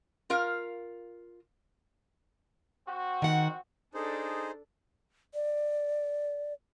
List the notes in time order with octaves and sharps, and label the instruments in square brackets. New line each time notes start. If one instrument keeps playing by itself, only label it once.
[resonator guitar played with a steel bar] F4 A#4 F5
[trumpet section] C4 F#4
[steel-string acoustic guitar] D#3 F#5
[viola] D4 A4 [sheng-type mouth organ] D#4 G#4 C5
[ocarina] D5